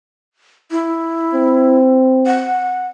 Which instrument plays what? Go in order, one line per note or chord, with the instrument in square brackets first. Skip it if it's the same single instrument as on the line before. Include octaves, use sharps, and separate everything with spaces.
[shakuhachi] E4
[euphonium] C4
[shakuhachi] F#5